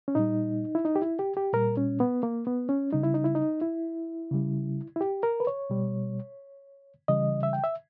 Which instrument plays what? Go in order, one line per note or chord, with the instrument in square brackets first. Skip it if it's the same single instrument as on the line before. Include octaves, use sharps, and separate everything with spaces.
[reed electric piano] C#4
A#2 G3 D#4
E4
D#4
G4
E4
G4
G4
A#2 G3 A#4
C#4
B3
A#3
B3
C#4
C#3 G3 D#4
E4
D#4
E4
D#4
E4
C#3 G3
E4
G4
A#4
B4
C#5
B2 G3
C#3 E3 G3 D#5
E5
G5
E5